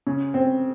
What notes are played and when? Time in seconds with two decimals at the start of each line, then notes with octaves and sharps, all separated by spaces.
0.07 C#3
0.34 C4